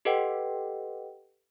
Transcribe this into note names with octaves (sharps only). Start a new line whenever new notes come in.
G4 A4 B4 D#5 F#5 G5